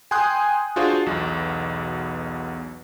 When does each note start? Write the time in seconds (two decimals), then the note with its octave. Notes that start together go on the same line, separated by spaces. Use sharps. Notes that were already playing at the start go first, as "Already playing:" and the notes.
0.11 G5 G#5 C6 D#6 F#6 G6
0.76 D4 F4 F#4 G#4 C5
1.06 B1 E2 B2